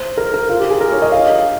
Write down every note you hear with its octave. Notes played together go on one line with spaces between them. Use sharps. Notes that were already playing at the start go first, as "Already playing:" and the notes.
Already playing: C5
A#4
A#4
F4
G4
G#4
A#4
C#5
D#5
F5